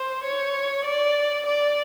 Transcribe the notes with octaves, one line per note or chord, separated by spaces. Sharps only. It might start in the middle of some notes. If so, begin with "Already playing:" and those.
Already playing: C5
C#5
D5
D5